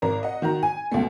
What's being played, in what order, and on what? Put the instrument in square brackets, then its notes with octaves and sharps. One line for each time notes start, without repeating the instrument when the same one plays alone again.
[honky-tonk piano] G#1 A#4 A#5
D#5 F#5
D#3 F#4 A#5
G#5
C#2 B2 A3